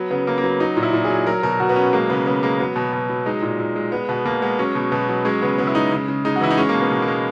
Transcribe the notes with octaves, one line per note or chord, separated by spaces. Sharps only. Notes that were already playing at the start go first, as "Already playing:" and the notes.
Already playing: F#3 B3
C#3 B3
C#3 A#3
A#3
F#3 B3
F#3 D#4
A#2
E4
A#2
G#4
F#3
F#3 A#4
B2 A#4
B2 F#4
B3
F#3 C#4
G#3 A#3
C#3 B3
C#3 B3
G#3 A#3
F#3 B3
B2
B2
F#3
G#3 D#4
A#2
A#2
G#3
G#3 B3
B2 B3
B2 A#3
G#3 B3
F#3 C#4
B2
B2 B3
F#3
G#3 C#4
C#3 B3
C#3 B3
E4
G#3 D#4
C#3
C#3
G#3 D#4
F#4
E3 E4
D#4
G#3 C#4
A#3
B2
B3
B2
A#3
G#3